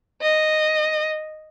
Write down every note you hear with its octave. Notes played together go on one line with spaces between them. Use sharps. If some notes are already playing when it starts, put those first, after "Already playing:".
D#5